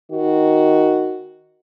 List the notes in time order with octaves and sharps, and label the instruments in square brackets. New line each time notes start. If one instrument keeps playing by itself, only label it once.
[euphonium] D#3 [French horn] F#4